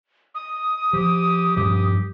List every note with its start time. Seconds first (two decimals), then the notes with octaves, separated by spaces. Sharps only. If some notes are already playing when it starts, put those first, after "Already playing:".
0.35 D#6
0.93 F3 G4
1.57 G2 F3 G4